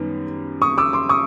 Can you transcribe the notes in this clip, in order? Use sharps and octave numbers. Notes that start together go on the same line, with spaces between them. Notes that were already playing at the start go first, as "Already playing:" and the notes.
Already playing: F#2 D#3 G3 B3
C#6 D#6
D6 E6
C6 D6
C#6 D#6